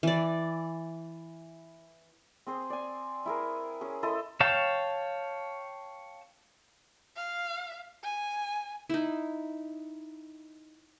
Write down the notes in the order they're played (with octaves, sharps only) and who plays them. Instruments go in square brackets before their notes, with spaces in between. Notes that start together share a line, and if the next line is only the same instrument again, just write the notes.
[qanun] E3 D5
[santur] C4 G#4 C5
D5 G#5
E4 G#4 A#4
C#4 G#4
E4 A4 D#5 C6
[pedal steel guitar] C#5 F5 G5 A5
[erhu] F5
G#5
[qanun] D#4 E4